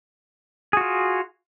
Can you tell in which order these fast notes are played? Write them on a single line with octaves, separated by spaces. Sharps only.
G#4 F#4 F4